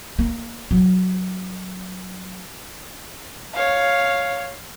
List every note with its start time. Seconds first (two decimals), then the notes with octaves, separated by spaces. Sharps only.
0.19 A#3
0.71 F#3
3.53 C#5 F5